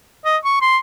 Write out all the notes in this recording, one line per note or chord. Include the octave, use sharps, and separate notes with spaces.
D#5
C#6
C6